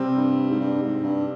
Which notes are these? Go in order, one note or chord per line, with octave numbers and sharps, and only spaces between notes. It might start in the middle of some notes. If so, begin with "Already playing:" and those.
Already playing: C3 G3 C4
G2
G#2
G2
G#2
G2